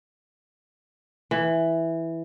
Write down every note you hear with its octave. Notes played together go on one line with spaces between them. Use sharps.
E3